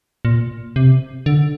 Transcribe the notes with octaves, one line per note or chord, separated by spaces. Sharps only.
A#2
C3
D3